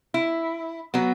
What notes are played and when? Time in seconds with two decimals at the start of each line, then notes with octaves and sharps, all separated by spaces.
0.14 E4
0.94 F#3 B3